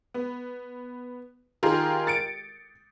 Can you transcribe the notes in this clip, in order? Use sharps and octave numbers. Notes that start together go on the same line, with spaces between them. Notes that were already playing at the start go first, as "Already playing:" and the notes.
B3
D#3 F4 G4 G#4 A#4
A6 C#7 D7